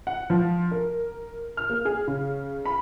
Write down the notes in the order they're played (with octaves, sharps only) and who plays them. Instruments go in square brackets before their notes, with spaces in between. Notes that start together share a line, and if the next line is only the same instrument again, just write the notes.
[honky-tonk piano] F#5
F3
A#4
F6
A#3
G#4
C#3
B5